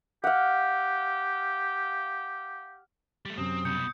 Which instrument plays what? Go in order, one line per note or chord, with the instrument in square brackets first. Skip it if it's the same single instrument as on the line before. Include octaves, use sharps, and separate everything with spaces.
[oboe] G4 [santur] F5 F#5
[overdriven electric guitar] G3 A3
[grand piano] F#2 C3 [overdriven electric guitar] C4 [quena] D#6
[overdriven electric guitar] C2 B2 [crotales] G6 C#7